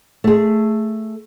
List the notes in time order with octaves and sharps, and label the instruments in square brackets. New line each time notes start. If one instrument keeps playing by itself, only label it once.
[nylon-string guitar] A3 G#4